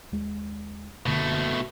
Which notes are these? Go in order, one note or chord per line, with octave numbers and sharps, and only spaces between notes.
D#2 G#3
F#1 B2 D3 A3 A#3